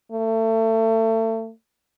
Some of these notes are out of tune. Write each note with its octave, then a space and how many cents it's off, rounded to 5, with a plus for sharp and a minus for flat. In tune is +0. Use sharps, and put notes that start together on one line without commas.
A3 +30